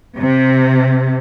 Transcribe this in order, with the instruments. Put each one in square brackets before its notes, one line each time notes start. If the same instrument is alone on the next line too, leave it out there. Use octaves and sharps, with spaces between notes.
[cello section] C3